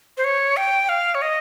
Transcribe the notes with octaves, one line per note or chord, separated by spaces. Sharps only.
C5
C#5
G5
F5
C#5
D#5